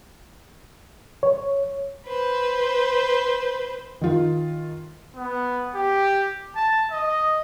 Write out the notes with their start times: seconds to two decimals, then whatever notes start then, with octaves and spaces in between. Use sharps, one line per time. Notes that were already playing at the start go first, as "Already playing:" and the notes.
1.23 C#5
2.07 B4 C5
4.01 D#3 F4
5.16 B3
5.75 G4
6.56 A5
6.91 D#5